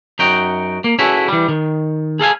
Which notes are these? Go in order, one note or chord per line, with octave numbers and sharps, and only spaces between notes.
F#2 D#4 F#4 G5
A#3
C#4 E4 F#4 G#4 A4 B4
E3 G3
D#3
G#4 A4 F5 G#5